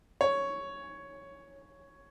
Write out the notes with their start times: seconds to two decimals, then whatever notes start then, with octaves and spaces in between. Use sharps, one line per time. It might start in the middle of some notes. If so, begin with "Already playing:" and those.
0.21 C#5